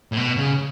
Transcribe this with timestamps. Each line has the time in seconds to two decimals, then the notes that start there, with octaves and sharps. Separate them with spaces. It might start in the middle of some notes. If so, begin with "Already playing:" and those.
0.12 A2
0.17 B2
0.37 C#3